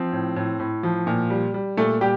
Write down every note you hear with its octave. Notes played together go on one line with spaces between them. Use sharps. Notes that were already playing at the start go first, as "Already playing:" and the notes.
Already playing: F3 C4
A2
A2
A2
F3
A#2
G3
G3
A#2 A3 A4
A#2 G3 G4